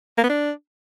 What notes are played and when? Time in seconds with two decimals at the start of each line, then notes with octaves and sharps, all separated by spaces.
0.18 A#3
0.24 B3
0.30 D4